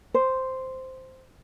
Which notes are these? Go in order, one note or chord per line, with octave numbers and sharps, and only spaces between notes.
C5